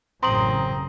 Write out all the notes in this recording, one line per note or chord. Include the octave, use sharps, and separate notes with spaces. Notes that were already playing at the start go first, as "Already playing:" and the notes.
A1 F#2 C#3 C4 A#5 C6 D#6 F#7